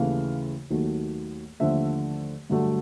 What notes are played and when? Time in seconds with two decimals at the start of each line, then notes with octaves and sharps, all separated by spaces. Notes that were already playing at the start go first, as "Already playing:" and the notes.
Already playing: D#2 C#3 E3 A3 F5
0.70 D#2 D#3 F#3 A3
1.60 D#2 D3 F3 A3 E5
2.50 G2 D3 F#3 A3